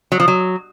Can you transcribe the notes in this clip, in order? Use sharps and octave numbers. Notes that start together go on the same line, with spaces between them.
F#3
F3
F#3